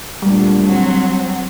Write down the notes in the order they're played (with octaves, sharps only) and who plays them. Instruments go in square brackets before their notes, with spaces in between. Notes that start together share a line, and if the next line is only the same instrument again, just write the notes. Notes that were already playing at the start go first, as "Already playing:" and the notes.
[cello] D2 A#2 [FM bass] G3
[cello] F#3 C4